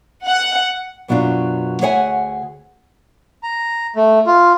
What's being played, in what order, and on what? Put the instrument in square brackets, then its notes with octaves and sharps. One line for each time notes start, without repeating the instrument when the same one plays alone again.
[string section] F#5
[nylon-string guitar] F#2 B2 F#3 D4 F4
D2 G#4 C#5 E5 F#5 G#5
[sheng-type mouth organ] A#5
A3
F4